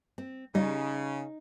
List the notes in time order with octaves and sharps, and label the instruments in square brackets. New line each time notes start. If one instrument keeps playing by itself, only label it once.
[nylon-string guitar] C4
[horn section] C#3 [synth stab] G3 [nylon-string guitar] D#4